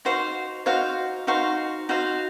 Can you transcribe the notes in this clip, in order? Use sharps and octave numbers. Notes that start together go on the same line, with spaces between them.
D#4 F#4 C5 F5
D#4 F#4 C5 F5
D#4 F#4 C5 F5
D#4 F#4 C5 F5